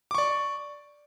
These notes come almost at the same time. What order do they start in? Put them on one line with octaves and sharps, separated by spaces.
D6 C#6 D5